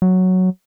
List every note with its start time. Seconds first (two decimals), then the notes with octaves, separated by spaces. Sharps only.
0.02 F#3